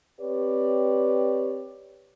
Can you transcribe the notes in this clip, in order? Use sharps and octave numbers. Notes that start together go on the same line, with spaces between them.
C4 G4 B4 C#5 D5